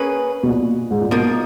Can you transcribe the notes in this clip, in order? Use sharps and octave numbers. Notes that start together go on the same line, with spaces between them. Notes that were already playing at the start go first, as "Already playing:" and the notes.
Already playing: A#3 C#4 G#4 B4
B2
A#2
G#2
A#2
B2 F3 A#3 D#4